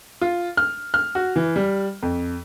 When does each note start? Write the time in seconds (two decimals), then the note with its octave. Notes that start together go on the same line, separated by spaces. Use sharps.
0.21 F4
0.57 F6
0.94 F6
1.15 F#4
1.36 E3
1.56 G3
2.02 F2